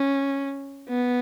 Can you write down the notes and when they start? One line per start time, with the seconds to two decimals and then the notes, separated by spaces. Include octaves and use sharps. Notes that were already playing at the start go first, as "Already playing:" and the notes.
Already playing: C#4
0.89 B3